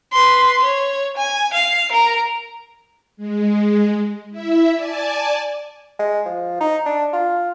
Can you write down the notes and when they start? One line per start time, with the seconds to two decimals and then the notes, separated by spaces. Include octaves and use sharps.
0.12 B4 C6
0.64 C#5
1.17 G#5
1.54 F5
1.92 A#4 A#5
3.17 G#3
4.31 E4 E5
4.72 D5 G#5 A5
5.99 G#3
6.25 F3
6.60 D#4
6.86 D4
7.13 F4